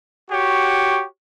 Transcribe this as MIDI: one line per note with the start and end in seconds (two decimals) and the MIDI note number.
0.30 1.04 66
0.30 1.04 67
0.30 1.04 73